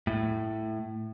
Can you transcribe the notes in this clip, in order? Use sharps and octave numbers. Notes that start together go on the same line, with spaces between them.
A2